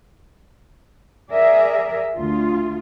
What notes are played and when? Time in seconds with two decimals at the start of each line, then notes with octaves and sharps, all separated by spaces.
1.31 G#4 A#4 D5 E5
2.14 D2 F4